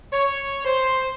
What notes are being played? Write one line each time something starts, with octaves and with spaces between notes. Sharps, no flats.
C#5
C5